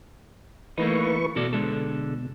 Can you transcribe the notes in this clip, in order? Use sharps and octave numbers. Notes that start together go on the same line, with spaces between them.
E3 A3 A#3 D#4 B4 C#6
B2 F#4 A4 D5
D3 G#3 A4